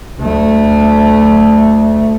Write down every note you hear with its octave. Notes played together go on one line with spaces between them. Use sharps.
D2 A3